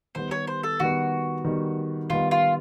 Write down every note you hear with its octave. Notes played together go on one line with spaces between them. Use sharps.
D#3 G3 B3 C5
C#5
C5
A4
D#3 G3 B3 F#4
D#3 G3 B3
D#3 G3 B3 F4
F4